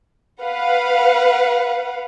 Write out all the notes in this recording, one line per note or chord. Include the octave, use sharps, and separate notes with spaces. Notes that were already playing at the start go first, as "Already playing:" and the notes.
B4 F5 F#5